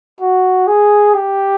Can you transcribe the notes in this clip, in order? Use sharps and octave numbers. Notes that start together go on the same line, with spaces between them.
F#4
G#4
G4